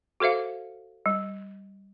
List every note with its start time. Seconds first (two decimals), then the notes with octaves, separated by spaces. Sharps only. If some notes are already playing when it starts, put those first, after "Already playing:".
0.20 F#4 A4 C5 E5 F5
1.06 G3